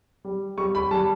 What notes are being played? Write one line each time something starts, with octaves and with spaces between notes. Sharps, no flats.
G3
G3 C#6
B5
G3 A5